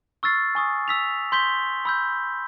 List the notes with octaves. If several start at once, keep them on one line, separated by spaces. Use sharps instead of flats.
C#6 E6 F6 A6 C7
G#5 C#6 D#6
E6 B6 F7
C6 G6 B6 G7
B5 E6 G6